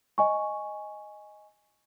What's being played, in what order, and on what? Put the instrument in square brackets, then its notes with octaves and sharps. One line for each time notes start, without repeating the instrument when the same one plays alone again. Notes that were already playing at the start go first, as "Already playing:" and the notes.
[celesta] D#5 G#5 C#6